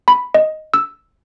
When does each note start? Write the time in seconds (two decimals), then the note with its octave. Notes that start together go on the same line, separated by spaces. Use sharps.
0.08 B5
0.34 D#5
0.74 E6